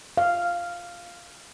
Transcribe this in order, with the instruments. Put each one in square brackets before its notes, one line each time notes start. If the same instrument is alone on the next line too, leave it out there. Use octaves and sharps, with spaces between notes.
[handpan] F5